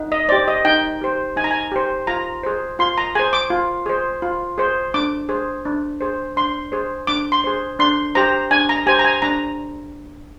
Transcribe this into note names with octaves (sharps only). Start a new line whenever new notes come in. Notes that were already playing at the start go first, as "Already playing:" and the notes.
Already playing: D#4
D#5
G4 C5 D5
D#5
D#4 G5
G4 C5
D#4 G#5
A#5
G#5
G4 C5
F4 A#5
G#4 C5
F4 C6
A#5
G#4 C5 G#5
D6
F4
G#4 C5
F4
G#4 C5
D4 D6
G#4 C5
D4
G#4 C5
D4 C6
G#4 C5
D4 D6
C6
G#4 C5
D4 C6
G4 C5 A#5
D4 G#5
A#5
G4 C5 G#5
A#5
G#5
D4 A#5